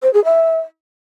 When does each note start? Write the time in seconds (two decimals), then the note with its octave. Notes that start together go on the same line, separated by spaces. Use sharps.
0.03 C5
0.13 G#4
0.24 E5